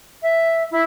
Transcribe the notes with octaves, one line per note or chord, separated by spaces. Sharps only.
E5
E4